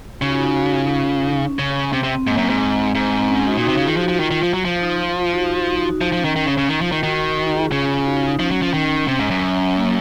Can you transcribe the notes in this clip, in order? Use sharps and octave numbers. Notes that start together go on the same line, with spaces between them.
C#3 D#4 F#4
F4
D#4 F#4
D#4 F#4
F4
D#4
F4
D#4
C#4
C#3
C3
C3 C4
C4
G#2 A#3
F#2
C4
G#2
G#2
C4
C#4
D#4 F#4
A#2
D#4 F#4
C3
C#3 F4 G#4
D#3
F3 D#4 F#4
F3
F4
D#3
D#3 F4
F3
F#3
F3
D#4
F4
D#4 F#4
D#4 F#4
D#4 F#4
F3 D#4
F3
C#4
D#3
D#3
C#3
C#3
D#3 D#4
F3
F4
D#3
D#3 D#4 F#4
D#4 F#4
F4 G#4
C#3
D#4 F#4
F4
D#4
F3 C#4
F#3
F3
D#3
C3
G#2
F#2
A#3